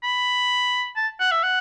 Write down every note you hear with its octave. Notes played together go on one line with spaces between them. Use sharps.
B5
A5
F#5
E5
F#5